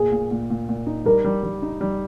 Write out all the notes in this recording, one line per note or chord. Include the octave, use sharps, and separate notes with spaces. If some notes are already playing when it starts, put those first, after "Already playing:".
Already playing: A#2 G#4
A#2
A#2
A#2
A#2
D#4
G3 A#4
G3
G3
D#4
G3